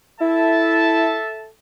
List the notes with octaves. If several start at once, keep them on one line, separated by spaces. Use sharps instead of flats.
E4 A4 E5 A5